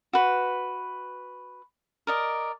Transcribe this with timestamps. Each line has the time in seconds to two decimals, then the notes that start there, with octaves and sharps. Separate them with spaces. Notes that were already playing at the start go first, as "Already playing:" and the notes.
0.13 F#4 B4
2.07 A#4 D5 D#5